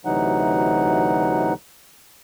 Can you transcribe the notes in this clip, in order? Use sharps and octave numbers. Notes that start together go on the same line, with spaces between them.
D2 C3 E3 F#3 D#4 F#5